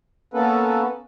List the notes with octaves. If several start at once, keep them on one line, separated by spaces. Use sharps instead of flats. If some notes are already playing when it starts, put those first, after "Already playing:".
A#3 B3 C#4 A4 B4